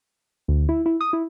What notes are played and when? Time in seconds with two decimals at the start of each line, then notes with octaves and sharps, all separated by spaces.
0.48 D2
0.69 E4
0.86 E4
1.01 D#6
1.13 E4